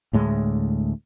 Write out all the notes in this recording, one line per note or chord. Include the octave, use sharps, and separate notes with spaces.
D2 A2 G#3